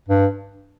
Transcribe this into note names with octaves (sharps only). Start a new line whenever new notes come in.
G2